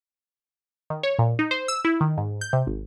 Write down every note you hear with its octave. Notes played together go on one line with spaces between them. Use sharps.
D#3
C#5
A#2
D#4
C5
E6
E4
D#3
G#2
G6
C3
G#1